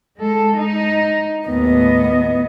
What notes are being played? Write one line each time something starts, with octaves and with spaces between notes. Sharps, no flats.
G#3 A4
D#4
D#2 A2 B3 D#5